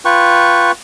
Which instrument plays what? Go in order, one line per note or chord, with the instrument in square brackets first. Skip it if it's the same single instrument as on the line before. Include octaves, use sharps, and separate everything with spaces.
[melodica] F4 B4 G5 C#6